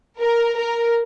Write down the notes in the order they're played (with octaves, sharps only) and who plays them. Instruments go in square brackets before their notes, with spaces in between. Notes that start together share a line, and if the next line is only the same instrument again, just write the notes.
[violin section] A#4
A#4